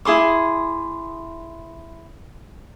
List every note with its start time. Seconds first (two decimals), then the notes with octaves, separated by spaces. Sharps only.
0.05 E4 G#4 C6 D6